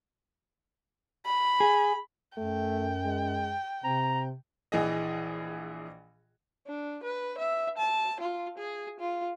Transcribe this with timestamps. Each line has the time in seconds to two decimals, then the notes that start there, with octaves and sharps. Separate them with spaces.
1.26 B5
1.60 G#4
2.38 F#2 A3 G5
3.05 G#3
3.84 C3 C4 A#5
4.72 A#1 E3 G#4 D#5
6.67 D4
7.03 B4
7.38 E5
7.78 A5
8.20 F4
8.58 G#4
9.00 F4